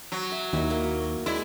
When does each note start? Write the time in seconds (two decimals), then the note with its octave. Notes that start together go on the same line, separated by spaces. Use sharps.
0.12 F#3
0.32 E5
0.53 D#2 D#4 E4
0.70 A#3 E4
0.84 F#4
1.26 G#3 E4 D5 G#5